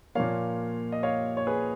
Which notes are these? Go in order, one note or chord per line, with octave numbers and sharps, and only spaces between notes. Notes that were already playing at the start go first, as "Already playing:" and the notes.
A#2 F3 A#3 C#5 F5
D#5
C#5 F5
C#5
G#4 B4